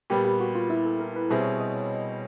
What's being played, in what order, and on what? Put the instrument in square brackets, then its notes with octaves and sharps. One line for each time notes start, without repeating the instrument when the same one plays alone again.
[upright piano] A#2 G3 B3 [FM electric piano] G4
[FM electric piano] G4
F#4
F4
E4
A4
A#4
B4
[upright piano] B2 G3 C4 E4 G#4 [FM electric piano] B4
[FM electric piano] C#5
D#5